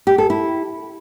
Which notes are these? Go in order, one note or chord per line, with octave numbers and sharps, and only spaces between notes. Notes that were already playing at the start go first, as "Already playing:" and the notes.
G4
A4
E4